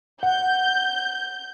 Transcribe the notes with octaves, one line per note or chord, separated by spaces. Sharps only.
F#5 G6